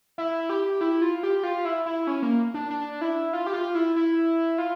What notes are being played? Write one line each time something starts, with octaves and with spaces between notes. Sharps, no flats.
E4
G4
E4
F4
G4
F4
E4
E4
C#4
A#3
D4
D4
E4
F4
G4
F4
E4
E4
F4